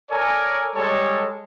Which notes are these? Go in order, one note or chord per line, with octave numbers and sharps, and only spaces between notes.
A4 A#4 C#5 D5 G#5 A#5
G3 G#3 A4 C#5 G#5 A5